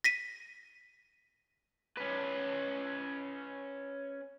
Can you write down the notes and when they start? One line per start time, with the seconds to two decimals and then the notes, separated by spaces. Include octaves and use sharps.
0.04 A#6 B6 D#7
1.97 C#4 B4